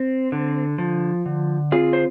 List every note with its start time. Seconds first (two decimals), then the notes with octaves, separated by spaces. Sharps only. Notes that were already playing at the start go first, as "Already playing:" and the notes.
Already playing: C4
0.32 D3
0.78 F3
1.26 D3
1.72 C4 F4 G#4
1.93 C5